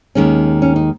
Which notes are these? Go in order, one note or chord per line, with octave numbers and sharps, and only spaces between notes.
D#2 D#3 G#3 C#4
C#4
D#4